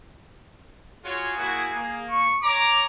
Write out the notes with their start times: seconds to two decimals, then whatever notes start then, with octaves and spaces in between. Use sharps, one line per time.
1.04 F4 F#4 G#4 C#5
1.37 A#3 E4 F#4
1.74 A#3
2.10 C#6
2.43 C#5 A#5 D6